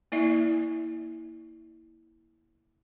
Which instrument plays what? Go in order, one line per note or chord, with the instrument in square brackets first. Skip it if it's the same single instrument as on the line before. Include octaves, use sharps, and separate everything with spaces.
[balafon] A#3 E4 D5 E5